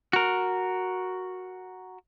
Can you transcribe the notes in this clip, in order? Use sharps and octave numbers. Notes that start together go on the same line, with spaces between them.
F#4 A#4